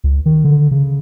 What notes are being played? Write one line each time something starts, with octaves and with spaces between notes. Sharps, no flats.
C#2
D#3
D3
C#3